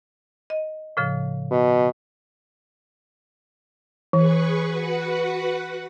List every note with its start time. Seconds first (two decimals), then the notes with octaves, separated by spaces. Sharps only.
0.50 D#5
0.97 A2 C#3 F3
1.51 B2
4.13 E3 G#4 B4 C#6
4.66 F#4 B4 F#5